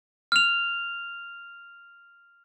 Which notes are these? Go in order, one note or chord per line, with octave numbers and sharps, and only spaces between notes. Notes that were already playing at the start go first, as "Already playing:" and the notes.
F6 F7